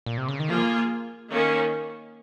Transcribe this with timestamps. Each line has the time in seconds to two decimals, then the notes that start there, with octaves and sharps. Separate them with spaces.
0.06 A#2
0.18 C3
0.28 C#3
0.40 D#3
0.50 F3 A#3 F4 G#4
1.30 D#3 A#3 C#4